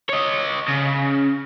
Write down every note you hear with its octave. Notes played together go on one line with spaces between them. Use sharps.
C#5 D#5
C#3